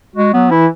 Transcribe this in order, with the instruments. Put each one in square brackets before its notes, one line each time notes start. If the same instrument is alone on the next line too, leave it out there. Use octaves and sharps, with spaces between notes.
[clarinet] G#3 [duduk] F#4
[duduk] F#3 [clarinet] B3
[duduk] E3 [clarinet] E4